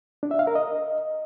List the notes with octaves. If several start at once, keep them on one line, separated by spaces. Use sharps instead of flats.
D4
E5
F5
A#4
D#5